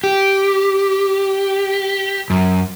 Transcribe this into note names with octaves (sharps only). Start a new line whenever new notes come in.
G4
F#2